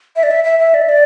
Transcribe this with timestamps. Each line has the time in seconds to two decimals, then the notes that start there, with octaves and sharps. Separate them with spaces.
0.16 E5
0.23 D5
0.31 E5
0.44 E5
0.59 E5
0.74 D5
0.82 E5
0.89 D5